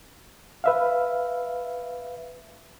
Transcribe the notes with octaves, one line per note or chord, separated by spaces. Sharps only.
B4 E5 F5